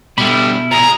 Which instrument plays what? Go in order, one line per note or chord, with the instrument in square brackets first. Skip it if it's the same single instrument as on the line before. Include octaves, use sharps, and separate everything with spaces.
[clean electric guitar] B2 [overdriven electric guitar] D3 G3 [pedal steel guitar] E4 B5
[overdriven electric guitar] A#2 G#4 [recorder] A#5